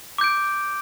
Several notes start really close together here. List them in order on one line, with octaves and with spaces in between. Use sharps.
D6 G6 D7